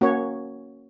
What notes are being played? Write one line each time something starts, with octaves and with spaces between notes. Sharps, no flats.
A#3 C#4 F#4 C#5